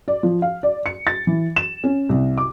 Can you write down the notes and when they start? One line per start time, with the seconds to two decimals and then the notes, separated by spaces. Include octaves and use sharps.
0.08 D5
0.23 F3
0.42 F5
0.63 D5
0.86 C#7
1.07 A6
1.27 E3
1.56 E7
1.84 C#4
2.09 C2
2.38 D6